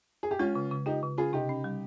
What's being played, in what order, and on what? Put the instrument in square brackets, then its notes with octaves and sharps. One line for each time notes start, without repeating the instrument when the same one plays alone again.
[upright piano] G#4
G4
[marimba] G#3 [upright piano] C#4 F4
[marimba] C#3
C#3
[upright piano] D#4 G4 [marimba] F4
[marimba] C#3
[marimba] C#4 [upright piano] F4 G#4
[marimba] C3 [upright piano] D#4 G4
[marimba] C#4
G3